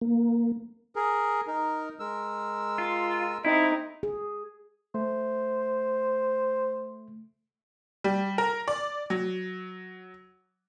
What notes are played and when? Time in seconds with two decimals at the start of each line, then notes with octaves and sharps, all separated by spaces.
0.01 A#3
0.96 G#4 A#4
1.47 D#4 A#4
2.00 G#3 A#4 E6
2.78 F4
3.45 C4 D#4 E4
4.03 G#4
4.94 A3 C5
8.04 G3
8.38 A#4
8.68 D5
9.10 F#3